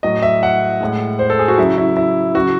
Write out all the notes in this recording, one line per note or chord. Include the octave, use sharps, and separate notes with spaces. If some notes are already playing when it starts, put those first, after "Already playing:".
A2 F#3 D#5
E5
F#5
A2 G#3
C5
A4
G#4
F#4
C#3 F#3 E4
E4
E4
C#3 F#3 F#4